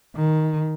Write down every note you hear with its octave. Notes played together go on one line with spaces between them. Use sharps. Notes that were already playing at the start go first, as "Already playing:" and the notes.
D#3